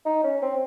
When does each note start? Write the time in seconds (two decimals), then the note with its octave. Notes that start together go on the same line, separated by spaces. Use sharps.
0.05 D#4
0.24 C#4
0.42 C4